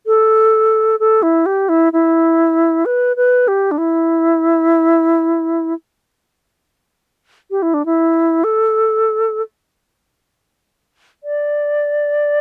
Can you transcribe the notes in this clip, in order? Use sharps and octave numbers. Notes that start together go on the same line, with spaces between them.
A4
A4
E4
G4
E4
E4
B4
B4
G4
D4
E4
G4
E4
D4
E4
A4
D5